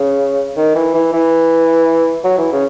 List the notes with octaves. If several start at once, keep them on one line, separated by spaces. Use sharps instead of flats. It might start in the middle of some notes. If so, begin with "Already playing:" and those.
Already playing: C#3
D#3
E3
E3
E3
F#3
E3
C#3